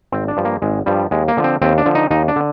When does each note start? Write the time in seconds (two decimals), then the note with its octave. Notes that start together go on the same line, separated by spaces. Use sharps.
0.12 G#1 C4
0.28 D4
0.37 G2 F3
0.45 A#3
0.62 G#1 G#3
0.86 G2 F3 G3
1.11 D#2 G#3
1.28 A#3
1.37 D3 F3
1.44 C4
1.62 D#2 C4
1.78 D4
1.86 D3 F3
1.95 D#4
2.11 D#2 D#4
2.28 D4
2.36 D3